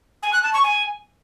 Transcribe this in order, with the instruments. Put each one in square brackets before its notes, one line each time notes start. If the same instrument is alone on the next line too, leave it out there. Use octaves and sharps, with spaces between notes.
[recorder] G#5
F#6
A5
C#6
G#5